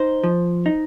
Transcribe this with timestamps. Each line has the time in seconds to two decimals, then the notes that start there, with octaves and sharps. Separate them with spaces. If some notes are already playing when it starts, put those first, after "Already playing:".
Already playing: D#4 C5
0.24 F3
0.66 D#4